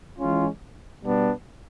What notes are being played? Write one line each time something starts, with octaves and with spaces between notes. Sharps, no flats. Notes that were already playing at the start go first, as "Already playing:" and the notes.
E3 G#3 C#4 F4
B2 G3 B3 D4